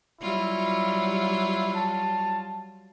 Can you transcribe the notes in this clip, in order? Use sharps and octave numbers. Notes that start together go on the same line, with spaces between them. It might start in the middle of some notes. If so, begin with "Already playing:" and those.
F#3 G3 E4 F4
A5